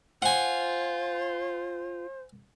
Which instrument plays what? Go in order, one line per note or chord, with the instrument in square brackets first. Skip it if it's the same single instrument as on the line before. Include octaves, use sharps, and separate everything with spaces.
[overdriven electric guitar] F4 [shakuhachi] C5 [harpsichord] F#5 G#5